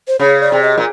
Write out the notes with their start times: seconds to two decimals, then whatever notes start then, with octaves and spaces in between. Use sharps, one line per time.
0.08 C5
0.19 C#3 C#5
0.41 D5
0.52 C3
0.63 D#5
0.78 A#2